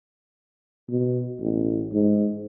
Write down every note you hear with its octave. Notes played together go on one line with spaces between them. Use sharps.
B2
A1
G#2